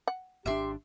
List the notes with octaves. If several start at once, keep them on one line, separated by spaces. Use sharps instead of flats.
F#5
G#1 D#3 D4 G4 E5 C6